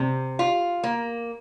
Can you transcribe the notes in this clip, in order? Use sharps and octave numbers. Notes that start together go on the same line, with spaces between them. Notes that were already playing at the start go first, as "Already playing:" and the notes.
Already playing: C3
F4
A#3